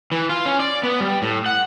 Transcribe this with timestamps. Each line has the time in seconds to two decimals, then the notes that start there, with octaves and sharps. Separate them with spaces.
0.12 E3
0.29 F4
0.46 C#4
0.60 D5
0.83 B3
1.00 G3
1.22 A2
1.46 F#5